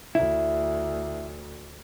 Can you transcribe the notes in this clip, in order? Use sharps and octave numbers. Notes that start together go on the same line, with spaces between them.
D2 E4